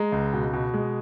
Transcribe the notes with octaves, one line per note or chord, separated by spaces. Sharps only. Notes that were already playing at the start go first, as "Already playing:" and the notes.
Already playing: G#3 A#5
C#2
B2
B2
G#3